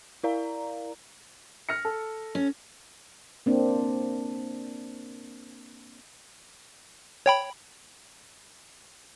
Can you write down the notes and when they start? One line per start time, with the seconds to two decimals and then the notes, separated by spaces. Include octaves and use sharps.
0.24 E4 A#4 D5 F5 A#5
1.69 F6 A#6 C#7
1.85 A4
2.35 C#4
3.46 A#3 C4 D4
7.26 C#5 G5 B5